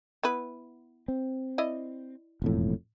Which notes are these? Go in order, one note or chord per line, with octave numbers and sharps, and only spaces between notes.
B3 E4 B4
C4
E4 D5 D#5
E1 F2 A2